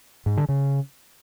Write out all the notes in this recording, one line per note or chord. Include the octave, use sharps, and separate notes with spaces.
G#2
D3
C#3